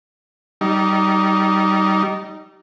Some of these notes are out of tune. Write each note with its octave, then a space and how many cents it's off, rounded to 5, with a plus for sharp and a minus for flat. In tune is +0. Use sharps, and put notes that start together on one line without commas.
G3 -25 D#4 +0